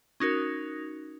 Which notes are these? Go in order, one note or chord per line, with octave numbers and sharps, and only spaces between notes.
C#4 D#4 F#4 A#4